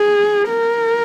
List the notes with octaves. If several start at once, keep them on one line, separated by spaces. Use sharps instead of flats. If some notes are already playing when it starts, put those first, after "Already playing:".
Already playing: G#4
A#4